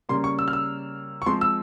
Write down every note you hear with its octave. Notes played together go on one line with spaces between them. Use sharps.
C#3 G3 A#3 C#4 C6
C#6
E6
F6
E6
C#6
F3 G#3 C4 C6
E6